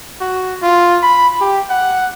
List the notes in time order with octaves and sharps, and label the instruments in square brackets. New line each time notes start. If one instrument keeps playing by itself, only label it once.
[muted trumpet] F#4
F4
B5
G4
F#5